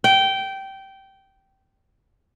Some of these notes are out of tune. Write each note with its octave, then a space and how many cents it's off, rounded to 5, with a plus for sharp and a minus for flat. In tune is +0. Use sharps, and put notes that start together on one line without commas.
G5 -15